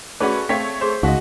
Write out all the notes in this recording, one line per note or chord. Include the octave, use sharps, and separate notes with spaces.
A3 C#4 F#4 G#4 B4 D5 D6
A3 C4 C#5 F5 G5 B6
G#4 C5 C6
C#2 D#4 F#4 D#5 F5